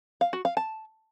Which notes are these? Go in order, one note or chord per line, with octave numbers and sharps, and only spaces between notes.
F5
F#4
F5
A5